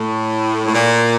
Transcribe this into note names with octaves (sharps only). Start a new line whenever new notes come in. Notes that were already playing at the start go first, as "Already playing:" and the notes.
Already playing: A2
A2
A#2